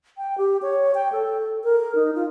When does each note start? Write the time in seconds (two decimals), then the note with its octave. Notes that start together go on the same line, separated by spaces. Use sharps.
0.18 G5
0.38 G4
0.62 C#5
0.95 G5
1.12 A4
1.64 A#4
1.95 D#4
2.15 F4